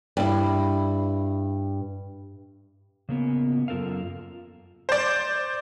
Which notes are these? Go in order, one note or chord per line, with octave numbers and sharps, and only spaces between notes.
G2 E4
C#3 A#3 B3
F#2 F4 A4 A#4 F5
C5 D5